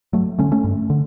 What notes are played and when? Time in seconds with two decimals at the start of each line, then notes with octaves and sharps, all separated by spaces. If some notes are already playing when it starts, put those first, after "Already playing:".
0.13 G2 F#3 A3
0.39 D3 A3 C#4
0.52 A3 C#4
0.64 G2
0.90 D3